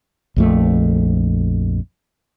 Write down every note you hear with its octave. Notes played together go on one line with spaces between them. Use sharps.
A#1 F2 A3